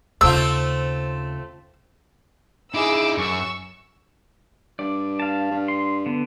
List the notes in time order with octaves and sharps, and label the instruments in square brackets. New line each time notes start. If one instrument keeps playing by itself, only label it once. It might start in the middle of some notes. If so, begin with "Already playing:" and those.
[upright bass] D#2 C#3 [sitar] A3 C4 F4 [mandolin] E6
[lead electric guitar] D#4 E4 [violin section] G#4 D6 E6
[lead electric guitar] F#2 [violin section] C#6 E6
[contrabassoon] G2 [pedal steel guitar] D5
[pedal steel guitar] F5 A5
[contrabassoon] G2
[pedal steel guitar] C6
D3 B3